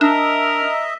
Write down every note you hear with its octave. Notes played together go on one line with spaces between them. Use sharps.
D4 A#4 D#5 E5